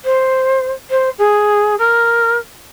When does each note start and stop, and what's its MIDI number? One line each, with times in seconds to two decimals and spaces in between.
0.04 0.69 72
0.90 1.09 72
1.18 1.75 68
1.78 2.37 70